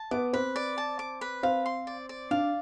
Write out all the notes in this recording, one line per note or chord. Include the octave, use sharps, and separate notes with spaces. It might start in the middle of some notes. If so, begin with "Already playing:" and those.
Already playing: A5
B3 D6
C4 B4
D5
A5
D6
B4
C4 F5
C6
D5
D5
D4 F5